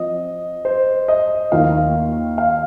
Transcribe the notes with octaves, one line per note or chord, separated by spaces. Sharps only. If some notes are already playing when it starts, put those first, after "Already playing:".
Already playing: F3 C4 D#5
C5
D#5
D#2 D#3 A#3 F4 F5
F5